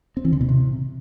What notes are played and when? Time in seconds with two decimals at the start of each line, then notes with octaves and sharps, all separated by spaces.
0.17 C4
0.25 E3
0.33 D3
0.41 B2
0.49 C3